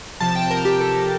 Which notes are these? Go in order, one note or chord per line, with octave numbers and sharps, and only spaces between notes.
C3 F3 A5
G5
A#4
G4
A4